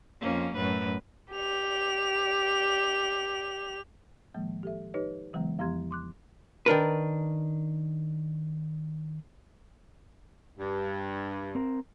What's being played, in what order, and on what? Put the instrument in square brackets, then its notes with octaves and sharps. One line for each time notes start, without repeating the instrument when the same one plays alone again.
[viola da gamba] F2 A#3 C#4
F#2 A2 B4
[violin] G4 F7
[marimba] A2 D#3 F3 G#3 A#3
G4 A4 E5
D#4 G4 B4 C#5 D#5
C#3 E3 F#3 G#3 B3
F2 F3 B3 G4 C6 G#6
C6 D6 F#6
[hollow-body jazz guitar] D#3 D4 A#4 B4
[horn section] G2
[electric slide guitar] C4 A#4